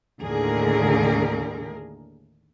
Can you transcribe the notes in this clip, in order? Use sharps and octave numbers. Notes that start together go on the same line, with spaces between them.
D#2 A2 D3 G#4 A#4